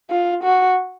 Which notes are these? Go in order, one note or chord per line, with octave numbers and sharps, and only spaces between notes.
F4
F#4